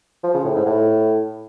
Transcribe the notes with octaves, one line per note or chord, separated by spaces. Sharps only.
F3
C#3
A2
G#2
A2